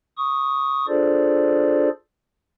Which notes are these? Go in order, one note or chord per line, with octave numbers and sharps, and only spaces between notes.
C#6 D#6
D4 F4 G#4 A4 C5 D5